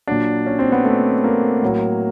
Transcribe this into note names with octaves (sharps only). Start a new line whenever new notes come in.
A#2 F#3 D4
C#4
C4
B3
A3
A#3
A2 F#3